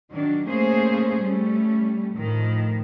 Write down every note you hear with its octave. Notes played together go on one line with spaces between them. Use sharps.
D#3 F#3 D4
A3 A#3 C#4 G#4 C5
G3 A3 C#4
A2 D#3 F3